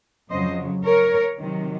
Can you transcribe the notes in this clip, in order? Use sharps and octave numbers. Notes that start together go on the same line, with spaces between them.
F2 C#3 F#3 C5 D#5
A#4 C#5
C3 D#3 F#3